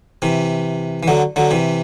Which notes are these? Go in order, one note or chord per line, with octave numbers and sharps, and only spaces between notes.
C3 E3
E3
D3 F#3
D3 F#3
C3 E3